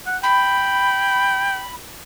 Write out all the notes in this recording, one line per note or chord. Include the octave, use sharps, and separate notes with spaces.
F#5
G5 B5